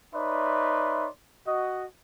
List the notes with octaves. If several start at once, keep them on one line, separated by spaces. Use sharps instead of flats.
D#4 B4 C#5 D5 E5 C6
F#4 D#5